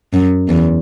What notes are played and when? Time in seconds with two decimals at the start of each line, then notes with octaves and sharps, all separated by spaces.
0.14 F#2
0.48 E2